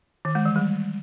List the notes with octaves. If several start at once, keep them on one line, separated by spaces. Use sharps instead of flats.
D#3
G#3
E3
G3